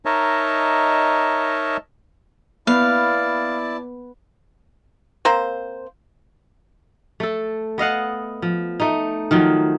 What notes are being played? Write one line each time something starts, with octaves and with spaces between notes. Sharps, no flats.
D#4 A#4 C#5 D#5 E5 A5
B3 E4 D5 F5 A5
A#3 C4 C5
A3 A4
B3 D#5 F5 F#5
F3
A3 D#4
D#3 F3 F#3